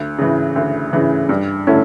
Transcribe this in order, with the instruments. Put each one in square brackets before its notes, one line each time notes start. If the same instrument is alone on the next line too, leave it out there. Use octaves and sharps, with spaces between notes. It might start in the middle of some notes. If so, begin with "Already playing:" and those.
Already playing: [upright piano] D2
C#3 E3
D2
C#3 E3
G2
D3 A3 C#4 E4